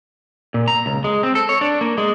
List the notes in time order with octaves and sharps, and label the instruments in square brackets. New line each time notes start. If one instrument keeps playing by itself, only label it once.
[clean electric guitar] A#2
A#5
C#2
G#3
C4
A4
C#5
D4
A#3
G#3